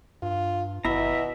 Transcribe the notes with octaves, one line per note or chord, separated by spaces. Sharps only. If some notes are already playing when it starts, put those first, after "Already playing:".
G2 F4
G#1 B2 E4 E5 A#5